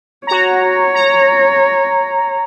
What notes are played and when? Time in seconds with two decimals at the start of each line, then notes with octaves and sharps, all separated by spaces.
0.27 F#4 C#5 A#5
0.94 A#5